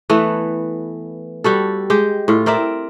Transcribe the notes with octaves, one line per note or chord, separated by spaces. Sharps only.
E3 A3 B3
G3 F#4 A4
G#3 G4
A2 F4
C4 A#4 D5 E5